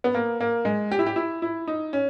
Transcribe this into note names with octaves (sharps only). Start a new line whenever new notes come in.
B3
A#3
A#3
G#3
G4
E4
G4
E4
E4
D#4
C#4